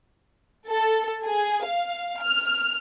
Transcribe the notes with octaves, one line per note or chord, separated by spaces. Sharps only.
A4
G#4
F5
F6